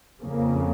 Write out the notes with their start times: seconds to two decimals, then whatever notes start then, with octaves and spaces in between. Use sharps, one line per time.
0.22 F2 C#3 A#3